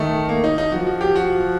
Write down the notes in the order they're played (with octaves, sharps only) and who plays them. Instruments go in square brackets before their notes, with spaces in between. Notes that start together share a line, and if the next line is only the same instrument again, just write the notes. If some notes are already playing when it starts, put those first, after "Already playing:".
Already playing: [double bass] D#3 [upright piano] A3
[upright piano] A#3
D#4
D#4
[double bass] F3 [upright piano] F#4
[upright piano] F#4
G4
F#4